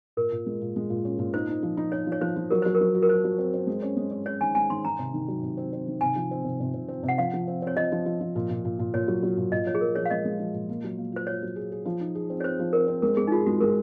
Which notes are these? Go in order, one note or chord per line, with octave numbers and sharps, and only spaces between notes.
A#2 A#4
A#2
G#3
A#2
G#3
A#2
C#4
A#2
D#4 C5
D#4
F3
D#4
D#4 C#5
F3
C#5
F3 C5
F3
F#3 A#4
F#3 C5
A#4
F#3
F#4
A#4
F#4 C5
F#3
C4
C4
G#3
C#4
G#3
C#4
C#4 C#5
D#3 G#5
G#3 G#5
D#3 C6
D#3 A#5
C3
D#3
F#3
C3
C4
C4
D#3
C3 G#5
F3
C4
C3
C3
C3
C4
C3
F#5
F3 F5
F3
C4
C4 C#5
F3 D#5
F3
F3
F3
A#2
A#2
A#2
A#2
A#2 C#5
F#3
F#3
A#2
A#2 D#5
F3 C#5
G#4
F3 A#4
F3 C#5
F5
G#3 D#5
G#3
F3
A#2
A#3
F#3
A#3
F4 C5
F4 C#5
F#3
G#4
G#4
F3
D#4
G#4
C4
C#5
C4 C5
F3
C4 A#4
C4
G#3 A#4
G#3 G#4
D#4
F4 G#4
G#3 F#4
G#3 A#4